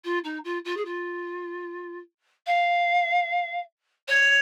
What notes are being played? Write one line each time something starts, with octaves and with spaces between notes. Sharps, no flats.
F4
D#4
F4
F4
G#4
F4
F5
C#5